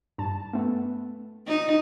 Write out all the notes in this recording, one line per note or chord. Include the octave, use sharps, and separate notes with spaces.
G2 A5
A3 B3
D#4